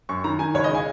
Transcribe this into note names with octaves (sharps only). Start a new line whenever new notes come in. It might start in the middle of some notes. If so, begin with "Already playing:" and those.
F#2 C#6
D#3 A#5
D#3 G#5
C#2 C#5
D#5
C#3 G#5